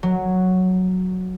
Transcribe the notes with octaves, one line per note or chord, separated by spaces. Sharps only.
F#3